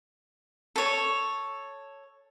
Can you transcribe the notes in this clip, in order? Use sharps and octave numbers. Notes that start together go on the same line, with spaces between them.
A4 C#5